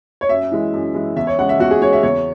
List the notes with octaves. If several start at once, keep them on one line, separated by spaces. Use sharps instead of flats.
C#5
F#2 E5
E3 G#3
F#2
E3 G#3
E2 E5
C#5
C#3 G#3 F#5
E5
E2 F#4
G#4
C#3 G#3 C#5
E5
E2 C#5